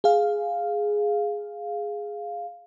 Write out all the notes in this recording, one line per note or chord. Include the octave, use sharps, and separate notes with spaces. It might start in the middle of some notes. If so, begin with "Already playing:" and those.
G#4 F5